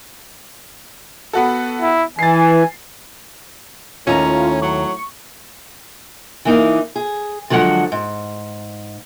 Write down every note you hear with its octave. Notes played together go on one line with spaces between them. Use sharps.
B3 F#4 A4
E4
E3 G#5 A6 C7
D#2 A2 C#4 F4 A#5
F#3 C#6
E3 A#3 D#4
G#4
D3 F3 F#3 G#3 F#5
G#2